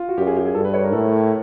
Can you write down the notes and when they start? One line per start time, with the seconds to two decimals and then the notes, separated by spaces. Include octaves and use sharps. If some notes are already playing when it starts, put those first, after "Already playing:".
Already playing: F4
0.08 F#4
0.18 F#2 G4
0.27 G#4
0.36 G4
0.45 G#4
0.55 G2 A4
0.64 B4
0.74 C#5
0.83 A#4
0.93 A2 A4